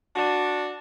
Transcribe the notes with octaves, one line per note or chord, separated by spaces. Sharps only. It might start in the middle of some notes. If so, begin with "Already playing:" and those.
D4 F#4